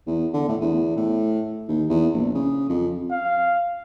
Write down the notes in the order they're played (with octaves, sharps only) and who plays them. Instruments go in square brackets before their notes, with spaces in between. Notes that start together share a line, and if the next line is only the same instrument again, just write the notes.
[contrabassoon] E2
D3
A2
E2
A2
D#2
E2
A#1
C#3
F2
[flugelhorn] F5